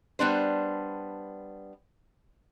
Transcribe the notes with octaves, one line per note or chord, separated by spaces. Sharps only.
G3 B3 D4 C5